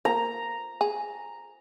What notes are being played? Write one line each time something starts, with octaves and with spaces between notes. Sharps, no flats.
A#3 A#5
G#4